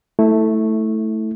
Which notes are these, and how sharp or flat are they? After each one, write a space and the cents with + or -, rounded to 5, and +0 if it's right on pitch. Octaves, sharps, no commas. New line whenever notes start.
A3 +0 E4 -15